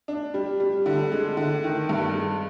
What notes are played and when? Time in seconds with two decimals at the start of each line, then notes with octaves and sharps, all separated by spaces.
0.08 D4
0.34 G3
0.60 G3
0.86 D3
1.12 G#3
1.37 D3
1.64 D#3
1.89 G2
2.15 G#3